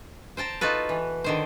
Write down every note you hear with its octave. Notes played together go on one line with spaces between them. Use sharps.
C5 G5 A5 A#5
D#4 F4 F#4 A4 B4
E3
D3 D#3 C5